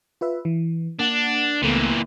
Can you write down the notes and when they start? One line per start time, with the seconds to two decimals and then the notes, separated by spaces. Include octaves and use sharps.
0.21 F4 B4 E5
0.45 E3
0.99 A#3 D4 F#5
1.62 C#2 A#2 E3 A3 B3